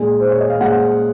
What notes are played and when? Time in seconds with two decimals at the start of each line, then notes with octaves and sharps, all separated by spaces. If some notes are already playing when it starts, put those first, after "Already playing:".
Already playing: A#2 G#3
0.20 C5
0.31 C#5
0.41 D#5
0.50 F5
0.60 A#2 G#3 F#5